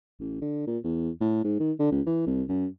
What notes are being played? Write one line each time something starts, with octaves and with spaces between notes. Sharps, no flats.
A1
D3
A#2
E2
A2
G#2
D#3
D3
C#2
E3
C2
F#2